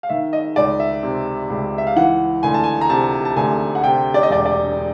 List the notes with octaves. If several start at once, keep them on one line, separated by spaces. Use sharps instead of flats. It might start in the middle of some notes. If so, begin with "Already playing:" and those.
F5
D#3 E5
D#5
C#2 D5
E5
C3
C#2
E5
F5
E3 F#5
D2 G#5
A5
G#5
A#5
C3 A5
A5
D2 G#5
F#5
C3 G5
D5
D#5
E1 D5
D5